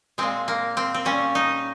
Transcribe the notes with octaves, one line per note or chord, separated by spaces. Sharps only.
A#2 G#3 C4
A#3
C4
C4
A#2 G3 C#4
D#4